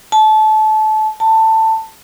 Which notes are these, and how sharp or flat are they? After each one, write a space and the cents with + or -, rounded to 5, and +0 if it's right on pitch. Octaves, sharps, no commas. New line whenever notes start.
A5 -25
A5 +15